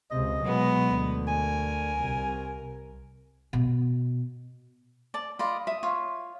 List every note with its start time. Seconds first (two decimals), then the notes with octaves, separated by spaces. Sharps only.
0.11 C#2 C3 D#5
0.43 B2 F#3 G#3 B3
0.87 D2
1.28 A#4 G#5
2.00 C2
3.53 B2
5.14 D5 A5
5.39 F4 D5 D#5 B5
5.67 E5 D#6
5.83 F4 C#5